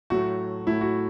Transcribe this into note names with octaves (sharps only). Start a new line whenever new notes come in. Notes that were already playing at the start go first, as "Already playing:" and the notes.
A2 F#3 A3 F#4
A2 F#3 A3 E4
F#4